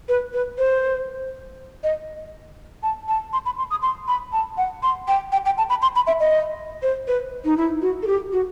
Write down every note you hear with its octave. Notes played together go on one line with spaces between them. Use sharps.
B4
B4
C5
D#5
A5
A5
C6
B5
C6
D#6
C6
B5
A5
F#5
C6
G5
G5
G5
A5
B5
C6
B5
E5
D#5
C5
B4
D#4
E4
F#4
A4
G4
F#4